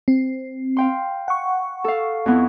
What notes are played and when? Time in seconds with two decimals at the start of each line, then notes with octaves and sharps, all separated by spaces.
0.08 C4
0.77 F5 G5 C6
1.28 F#5 C#6
1.84 A4 F5
2.26 F2 B3 E4